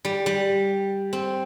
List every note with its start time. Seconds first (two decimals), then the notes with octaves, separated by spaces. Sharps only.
0.05 G3
0.26 G3
1.13 C4